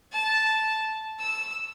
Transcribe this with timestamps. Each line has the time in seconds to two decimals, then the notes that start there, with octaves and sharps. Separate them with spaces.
0.13 A5
1.19 E6